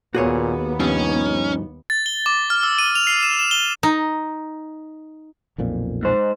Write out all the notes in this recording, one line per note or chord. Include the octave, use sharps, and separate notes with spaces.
D#2 A#2 B3 F#4 G#4 C#5
G2 B2 F3 C#4 D#4
A6
G7
D6
F6
E6
D#7
F7
C7
E7
E7
G7
D#4
B1 F2 A#2
G#2 C5